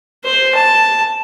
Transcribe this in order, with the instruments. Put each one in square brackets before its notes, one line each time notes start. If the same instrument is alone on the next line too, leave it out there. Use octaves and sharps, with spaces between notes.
[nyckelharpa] C5
A5